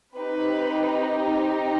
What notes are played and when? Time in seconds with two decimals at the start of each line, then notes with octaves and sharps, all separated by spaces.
0.16 C4 D#4 G4 B4